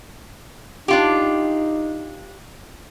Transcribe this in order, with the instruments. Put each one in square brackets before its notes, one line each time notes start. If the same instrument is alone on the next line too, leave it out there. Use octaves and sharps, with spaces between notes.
[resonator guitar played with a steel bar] D4 F4 G4 [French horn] D#4